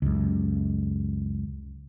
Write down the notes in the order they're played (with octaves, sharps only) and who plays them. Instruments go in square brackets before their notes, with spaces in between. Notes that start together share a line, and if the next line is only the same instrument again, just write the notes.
[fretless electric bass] C#2 F#2